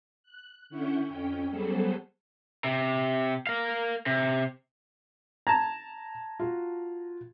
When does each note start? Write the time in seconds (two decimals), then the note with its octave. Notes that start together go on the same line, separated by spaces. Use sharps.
0.23 F#6
0.70 D3 C#4 E4 F#5 C#6 G6
1.07 F2 C#4 G5
1.49 F#3 G3 B3 G#4 A4 C5
2.64 C3
3.47 A#4 F5
4.06 C3
5.47 A5 A#5 G#6
6.40 F4 F#4